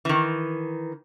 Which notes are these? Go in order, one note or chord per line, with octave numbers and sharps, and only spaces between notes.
D#3 E3